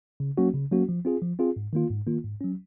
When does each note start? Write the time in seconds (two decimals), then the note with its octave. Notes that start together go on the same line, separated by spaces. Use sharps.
0.20 C#3
0.38 F#3 A#3 C#4 F#4
0.54 C#3
0.71 F#3 A#3 C#4 F#4
0.89 F3
1.05 C4 F4 G#4
1.22 F3
1.39 C4 F4 G#4
1.56 G#2
1.73 D#3 A#3 F4
1.90 G#2
2.07 D#3 A#3 F4
2.24 G#2
2.41 F#3 C#4